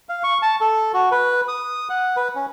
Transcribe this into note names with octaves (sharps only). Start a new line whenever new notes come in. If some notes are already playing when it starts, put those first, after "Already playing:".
F5
C#6
A5
A4
F#4
B4
D#6
F#5
B4
C#4